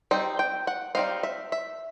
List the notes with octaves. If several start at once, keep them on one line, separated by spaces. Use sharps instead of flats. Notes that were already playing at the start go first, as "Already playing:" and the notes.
G3 C4 D#4
G5
F#5
G3 C4 D#4 F5
E5
E5